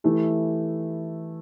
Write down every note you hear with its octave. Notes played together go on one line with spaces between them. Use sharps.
E3 A3 E4 G4